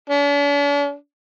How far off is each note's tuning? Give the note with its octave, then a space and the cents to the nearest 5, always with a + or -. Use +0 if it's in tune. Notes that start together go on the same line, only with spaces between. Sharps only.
D4 -45